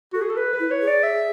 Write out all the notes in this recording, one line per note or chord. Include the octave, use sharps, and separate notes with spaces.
F#4 A4
G#4
A4
B4
B4
E4
C#5
G#4
D5
E5